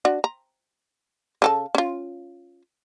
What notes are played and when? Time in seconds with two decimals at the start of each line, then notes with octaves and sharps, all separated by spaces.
0.05 D4 F#4
0.24 A#5
1.42 C#3 A4 A5
1.75 C#4 F4